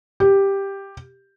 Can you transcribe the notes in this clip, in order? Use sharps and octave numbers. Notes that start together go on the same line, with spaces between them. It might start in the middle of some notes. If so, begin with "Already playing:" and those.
G4